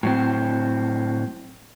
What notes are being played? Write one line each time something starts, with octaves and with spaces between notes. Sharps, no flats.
A2 F#3 C4